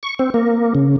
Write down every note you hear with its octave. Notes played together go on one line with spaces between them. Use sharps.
C#6
C4
A#3
C#3